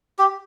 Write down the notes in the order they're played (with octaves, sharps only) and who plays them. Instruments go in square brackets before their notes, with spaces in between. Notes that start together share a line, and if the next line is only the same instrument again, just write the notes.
[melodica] G4